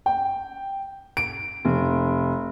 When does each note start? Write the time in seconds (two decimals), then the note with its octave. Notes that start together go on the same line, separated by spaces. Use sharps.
0.06 G5
1.17 D7
1.65 F1